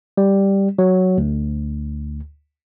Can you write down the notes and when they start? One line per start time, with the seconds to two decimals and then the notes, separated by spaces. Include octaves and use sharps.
0.17 G3
0.79 F#3
1.18 D2